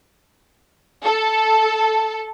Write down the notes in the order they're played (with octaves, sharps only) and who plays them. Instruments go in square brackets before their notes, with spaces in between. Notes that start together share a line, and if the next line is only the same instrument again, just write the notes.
[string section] A4